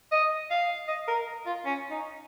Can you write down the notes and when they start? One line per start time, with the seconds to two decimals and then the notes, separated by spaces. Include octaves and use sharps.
0.12 D#5
0.50 F5
0.88 D#5
1.08 A#4
1.46 F4
1.65 C#4
1.90 D#4